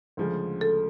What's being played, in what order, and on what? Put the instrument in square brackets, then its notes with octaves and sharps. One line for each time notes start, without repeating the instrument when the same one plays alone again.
[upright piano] D2 C#3 F3 G#3
[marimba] A4